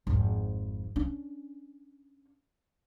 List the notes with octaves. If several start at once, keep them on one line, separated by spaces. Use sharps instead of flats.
G#1 F2
C#4 D4